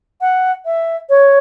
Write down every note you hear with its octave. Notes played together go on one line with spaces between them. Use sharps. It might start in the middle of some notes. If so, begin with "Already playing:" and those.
F#5
E5
C#5